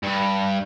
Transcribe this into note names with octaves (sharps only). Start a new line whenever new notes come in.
G2